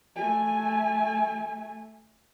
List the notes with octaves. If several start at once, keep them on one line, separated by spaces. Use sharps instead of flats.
A3 G#5